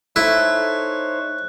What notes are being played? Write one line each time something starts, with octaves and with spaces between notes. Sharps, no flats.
A3 D#4 E4 C5 C#5 F#6